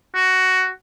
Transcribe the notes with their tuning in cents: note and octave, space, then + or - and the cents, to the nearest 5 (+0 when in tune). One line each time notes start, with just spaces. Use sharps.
F#4 +10